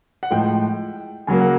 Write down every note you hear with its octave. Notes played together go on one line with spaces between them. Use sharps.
F#5
A2 F3 G#3 G5
C#3 F#3 A#3 G#5
F#5